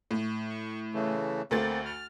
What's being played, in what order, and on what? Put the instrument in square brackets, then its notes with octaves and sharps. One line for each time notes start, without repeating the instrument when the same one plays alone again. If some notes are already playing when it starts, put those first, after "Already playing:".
[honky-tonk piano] A2
[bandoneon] C#6
C#3 E3 A3
[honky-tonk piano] D2 A3 A6 [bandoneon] A#3 C4
[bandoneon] F6